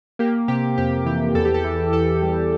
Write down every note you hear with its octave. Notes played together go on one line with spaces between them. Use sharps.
A#3 G4
C3 G4
F2 G4
E3 G4
E2 A4
G4
A4
E3
E2 A4
G3